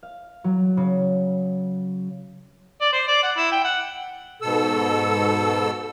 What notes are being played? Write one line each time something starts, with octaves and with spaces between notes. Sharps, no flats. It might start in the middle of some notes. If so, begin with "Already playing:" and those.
F5
F#3
C#3
D5
C5
D5
F#5
E4
G5
F#5
G#2 B2 A4 E6